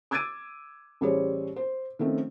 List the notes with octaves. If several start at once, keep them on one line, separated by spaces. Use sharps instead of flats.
D6 E6 G#6 A6 D7 D#7
A1 G3 G#4 C5 C#5
C5
D#3 F3 A3 C4 C#4